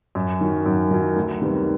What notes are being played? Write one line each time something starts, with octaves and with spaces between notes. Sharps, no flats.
F#2
D#3 F#3
F#2
D#3 F#3
D2
C3 D#3 G3 B3